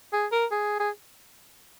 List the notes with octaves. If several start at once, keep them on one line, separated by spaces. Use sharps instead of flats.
G#4
A#4
G#4
G#4